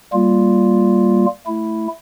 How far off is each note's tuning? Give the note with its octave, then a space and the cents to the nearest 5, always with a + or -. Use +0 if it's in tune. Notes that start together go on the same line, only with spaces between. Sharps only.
G3 +0 A#3 +0 F4 +0
A3 +0 E4 +0